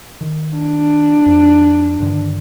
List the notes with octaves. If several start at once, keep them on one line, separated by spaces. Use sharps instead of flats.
D#3
D4
F2
G2 D3 D#3